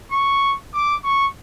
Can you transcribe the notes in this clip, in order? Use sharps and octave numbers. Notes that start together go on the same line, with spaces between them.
C#6
D6
C#6